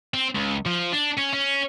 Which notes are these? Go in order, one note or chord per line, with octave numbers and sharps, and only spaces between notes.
C4
C#2
F3
D4
C#4
C#4